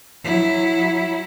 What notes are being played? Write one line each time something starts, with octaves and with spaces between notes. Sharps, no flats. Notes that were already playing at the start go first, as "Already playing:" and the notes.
F#3 E4